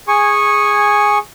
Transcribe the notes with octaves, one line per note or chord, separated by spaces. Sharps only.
G#4 G#5 C#6